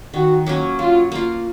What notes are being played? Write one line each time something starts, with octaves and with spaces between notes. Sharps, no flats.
D#3 F#4
F#3 A#3 C#4
F#3 F4
A#3 F4